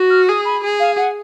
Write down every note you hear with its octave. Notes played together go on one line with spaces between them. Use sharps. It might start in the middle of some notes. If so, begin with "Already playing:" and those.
Already playing: F#4
F6
G#4 D#6
B5
G#4
F5
F#5